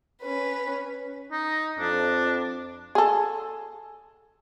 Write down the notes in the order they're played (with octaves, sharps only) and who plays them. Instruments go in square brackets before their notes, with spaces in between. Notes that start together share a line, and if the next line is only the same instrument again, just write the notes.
[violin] C#4 B4
[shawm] D#4
[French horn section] F2 [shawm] D4
[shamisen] G#4 A4